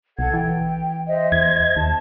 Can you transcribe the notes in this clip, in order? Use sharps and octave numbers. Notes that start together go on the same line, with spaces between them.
B1 A4 F#5 G#6
E3 G5
C5 D#5 E5
E2 G#6
D#2 A5